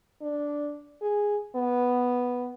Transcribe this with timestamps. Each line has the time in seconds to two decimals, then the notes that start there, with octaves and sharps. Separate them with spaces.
0.22 D4
1.02 G#4
1.55 B3